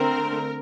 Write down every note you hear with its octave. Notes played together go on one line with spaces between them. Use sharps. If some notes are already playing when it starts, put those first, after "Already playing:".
Already playing: D3 A3 C4 A#4